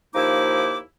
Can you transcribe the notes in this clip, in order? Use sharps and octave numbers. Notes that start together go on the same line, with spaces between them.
D#2 F3 A#3 D#4 E4 D6